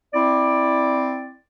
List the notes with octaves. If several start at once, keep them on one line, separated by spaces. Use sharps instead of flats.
C4 E4 D5